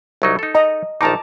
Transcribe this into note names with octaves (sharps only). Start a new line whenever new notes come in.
C2 F#3 D#4
D#4 A4
D#5 A#5
A#1 D#3 D#4 A5 A#5 D6